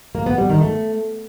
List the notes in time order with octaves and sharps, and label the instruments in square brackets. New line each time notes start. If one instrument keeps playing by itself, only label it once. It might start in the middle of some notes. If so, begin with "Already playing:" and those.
[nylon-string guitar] A#3
B3
G3
D#3
A3